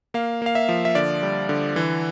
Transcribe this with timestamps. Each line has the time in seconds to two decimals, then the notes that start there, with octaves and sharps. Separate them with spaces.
0.14 A#3 F5
0.42 A#3 F5
0.55 E5
0.69 F3
0.85 E5
0.95 D3 D5
1.23 G3
1.49 D3
1.76 E3